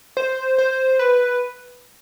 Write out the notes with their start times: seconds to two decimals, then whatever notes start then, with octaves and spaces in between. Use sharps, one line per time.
0.17 C5
0.58 C5
0.99 B4